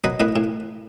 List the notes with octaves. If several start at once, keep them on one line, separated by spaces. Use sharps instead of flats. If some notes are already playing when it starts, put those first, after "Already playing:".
F#3 B4 D#5
A2 B4 D#5
A2